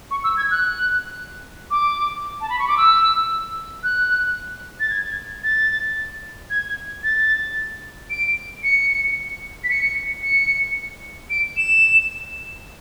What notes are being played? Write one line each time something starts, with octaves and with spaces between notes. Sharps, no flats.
C#6
E6
G#6
F#6
D6
A5
B5
C#6
D6
E6
F#6
A6
G#6
A6
G#6
A6
D7
C#7
B6
C#7
C#7
D7
E7